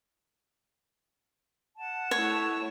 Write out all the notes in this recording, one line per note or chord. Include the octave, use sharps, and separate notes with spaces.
F#5 A5
A3 E4 C#5